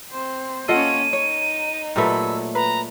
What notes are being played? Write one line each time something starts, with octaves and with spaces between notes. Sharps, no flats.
C4 C5
A#3 C#4 F4 A4 D#5 F#5 D#7
D#4 C#5
A#2 F#3 A3 G4 B4 E6
B4 A#5